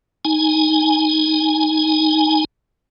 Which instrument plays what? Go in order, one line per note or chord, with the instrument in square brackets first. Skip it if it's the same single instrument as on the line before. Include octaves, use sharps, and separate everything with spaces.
[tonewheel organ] D#4 G#5